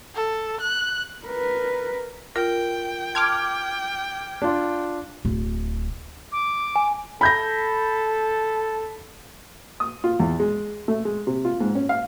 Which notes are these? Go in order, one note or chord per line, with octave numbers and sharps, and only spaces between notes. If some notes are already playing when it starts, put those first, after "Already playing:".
A4
F#6
A#4 B4
F4 A#4 G5
A5 C6 D6 F6 G#6
D4 F4
D1
D6
G#5
A4 B5 G6 A#6
D#6
F4
E2
G#3
A3
G#3
C3
F4
G#2
C#4
F5